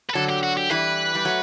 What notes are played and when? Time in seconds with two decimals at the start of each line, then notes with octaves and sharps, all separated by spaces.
0.10 B4
0.14 D3 F#3 A4
0.29 G4
0.43 F#4
0.57 G4
0.70 E3 G3 B4
1.15 G3
1.25 F#3 A3